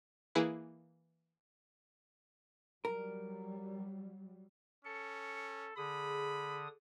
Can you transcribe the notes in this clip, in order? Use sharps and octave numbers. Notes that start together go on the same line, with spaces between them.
E3 A#3 E4 G#4 B4
F#3 G3 A#4
C#4 A4 C#7
D3 G#4 B5 D#6